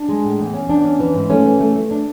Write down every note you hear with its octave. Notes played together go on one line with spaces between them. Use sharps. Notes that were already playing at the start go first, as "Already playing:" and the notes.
Already playing: D4
G#3
A2
E2
C#4
E2 D4
C#4
E3
G#2
A3 C#4
E3
A3
A3
D4